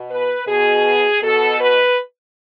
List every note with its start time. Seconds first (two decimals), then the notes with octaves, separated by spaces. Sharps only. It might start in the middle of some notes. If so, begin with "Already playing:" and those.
Already playing: B2
0.09 B4
0.47 B2 G#4
1.22 B2 A4
1.59 B4